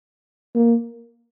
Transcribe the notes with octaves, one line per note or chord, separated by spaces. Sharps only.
A#3